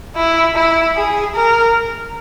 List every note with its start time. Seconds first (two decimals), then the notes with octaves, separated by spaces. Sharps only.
0.16 E4
0.56 E4
0.96 G#4
1.35 A#4